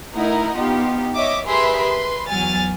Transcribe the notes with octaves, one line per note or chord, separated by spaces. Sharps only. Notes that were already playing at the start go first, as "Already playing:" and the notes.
A3 D#4 E4 A#4 D#5 F#5
B3 D#4 F4 G4
C#5 D#5 E5 D6
G4 G#4 A#4 B4 E5 C6
B4 C6
E2 F#3 G#5 F6 A6